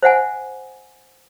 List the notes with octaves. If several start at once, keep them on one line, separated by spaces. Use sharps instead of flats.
C5 E5 F#5 G#5